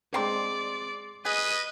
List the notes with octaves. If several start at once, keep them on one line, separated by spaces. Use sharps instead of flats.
G#3 C4 D4 D5 C6 C7
G#4 B4 D#5 D#6